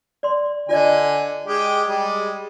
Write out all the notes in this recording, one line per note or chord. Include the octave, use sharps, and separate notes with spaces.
D5 C6
D3 F4 D5 D#5 G#5
G#3 G4 G5
G3 G#3